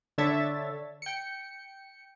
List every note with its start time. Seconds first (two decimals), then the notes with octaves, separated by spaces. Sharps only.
0.18 D3 D4 C#5 E5 A6
1.02 G5 C#7